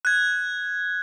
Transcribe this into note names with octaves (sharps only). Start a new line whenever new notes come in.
F#6 G#6